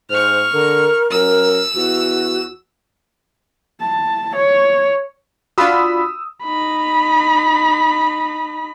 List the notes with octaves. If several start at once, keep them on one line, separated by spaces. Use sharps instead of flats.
G#2 C5 C#6 F6
D3 A#4
F#2 A#4 E6
E2 F#4
A5
C#5
D4 F4 F#4 B5 D#6 E6
D#4 B5